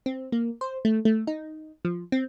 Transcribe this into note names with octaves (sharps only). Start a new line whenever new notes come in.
C4
A#3
C5
A3
A3
D#4
F3
C4